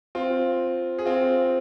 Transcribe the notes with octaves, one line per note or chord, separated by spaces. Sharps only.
C4 F4
G#4
C4 F4